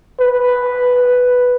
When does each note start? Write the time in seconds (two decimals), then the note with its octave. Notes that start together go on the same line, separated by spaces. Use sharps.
0.20 B4